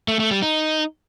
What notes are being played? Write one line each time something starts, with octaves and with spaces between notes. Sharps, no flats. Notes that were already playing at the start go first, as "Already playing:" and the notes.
A3
A3
G3
D#4